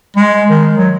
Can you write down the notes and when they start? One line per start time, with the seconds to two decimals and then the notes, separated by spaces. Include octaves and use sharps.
0.17 G#3
0.50 D#3
0.78 F#3